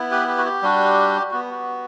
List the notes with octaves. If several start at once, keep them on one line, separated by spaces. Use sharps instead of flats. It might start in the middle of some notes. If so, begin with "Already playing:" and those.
Already playing: B3 E4
G4 B4
G4 B4
F#4
G4
G3 D4 F#4
B3 F#4
F#4